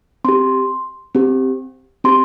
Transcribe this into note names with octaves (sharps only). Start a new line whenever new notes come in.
C4 G4 C6
C4 G4
C4 G4 C6